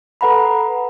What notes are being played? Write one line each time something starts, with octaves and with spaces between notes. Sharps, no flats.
A4 B4 F#5 A#5 B5